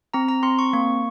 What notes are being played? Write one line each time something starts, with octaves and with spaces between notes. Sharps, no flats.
C4 A#5
A#5
C4 C6
C#6
A#3 C#6